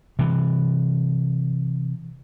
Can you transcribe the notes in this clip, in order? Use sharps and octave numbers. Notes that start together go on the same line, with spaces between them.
C3 E3